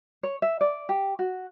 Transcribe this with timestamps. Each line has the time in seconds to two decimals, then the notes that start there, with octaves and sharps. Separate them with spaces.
0.23 C#5
0.42 E5
0.61 D5
0.89 G4
1.19 F#4